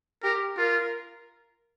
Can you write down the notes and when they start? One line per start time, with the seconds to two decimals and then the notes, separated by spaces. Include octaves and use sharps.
0.23 G4 A#4
0.57 F4 A#4